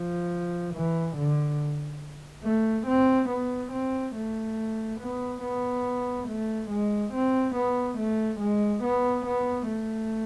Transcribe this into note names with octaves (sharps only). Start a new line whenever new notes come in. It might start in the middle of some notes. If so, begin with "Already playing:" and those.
Already playing: F3
E3
D3
A3
C4
B3
C4
A3
B3
B3
A3
G#3
C4
B3
A3
G#3
B3
B3
A3